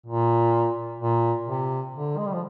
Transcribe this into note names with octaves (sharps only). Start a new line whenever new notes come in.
A#2
A#2
C3
D3
G#3
G3
F3